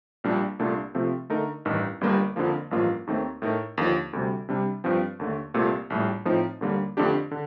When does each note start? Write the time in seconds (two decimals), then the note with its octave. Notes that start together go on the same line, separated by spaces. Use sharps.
0.24 A#1 A#2 G3 D4
0.59 C2 A#2 A3 D4
0.95 C3 F3 A3 C4
1.30 D3 A3 D#4 A#4
1.65 A1 G2 D#3
2.01 G1 G2 D3 G3 A#3
2.36 F2 D3 F3 A#3
2.71 A1 G2 F3 A#3 F4
3.07 D#2 D#3 A3 C4
3.42 A2 A3 D#4 A#4
3.78 D#2 D3 F3
4.13 D2 C3 G3
4.49 C3 G3 D4
4.84 G2 F3 C4
5.19 D#2 D3 A3
5.54 C2 A#2 A3 C4 G4
5.90 A#1 A2 G3
6.25 A2 F3 C4 D#4
6.61 D#2 D3 G3 A#3
6.97 F2 D3 A3 D4 G4
7.31 D3